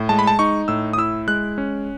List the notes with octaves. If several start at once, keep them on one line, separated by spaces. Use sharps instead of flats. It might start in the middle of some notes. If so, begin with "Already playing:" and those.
Already playing: A2
G#3 A5
B5
A5
D#4 C#6
A2 E6
D#6
E4 E6
G#3 F#6
C#4